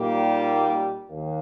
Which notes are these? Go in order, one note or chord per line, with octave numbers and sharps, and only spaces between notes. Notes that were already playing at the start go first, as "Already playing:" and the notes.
Already playing: A#2 G3 A#3 D#4 G4
D#2 D#3 A#3